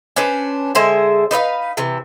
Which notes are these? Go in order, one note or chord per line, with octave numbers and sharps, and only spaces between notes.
C#4 D4 B4 C5
D3 G#3 C5 E5
D#4 B4 D#5 F5
C3 E3